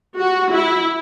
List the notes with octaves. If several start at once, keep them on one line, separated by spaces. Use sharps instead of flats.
F#4
E4